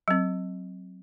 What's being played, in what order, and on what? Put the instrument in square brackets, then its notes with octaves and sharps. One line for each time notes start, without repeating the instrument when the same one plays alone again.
[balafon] F#3 C4